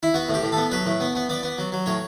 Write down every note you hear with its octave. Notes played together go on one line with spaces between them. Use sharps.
E4
B3 F#4
A2
G4
A2
B3 A4
F#3 B4
A2
B3
B3
B3 D5
B3
F#3
F#3
A2 C#5